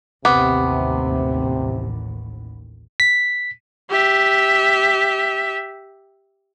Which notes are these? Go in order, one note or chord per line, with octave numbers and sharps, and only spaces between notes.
A1 D#2 C3 B3 D6
B6
G4 E5